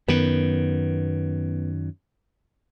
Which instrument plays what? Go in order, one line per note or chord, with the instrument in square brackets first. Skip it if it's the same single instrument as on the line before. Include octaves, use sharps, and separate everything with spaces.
[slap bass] F#2 D#3 [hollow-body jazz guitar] B3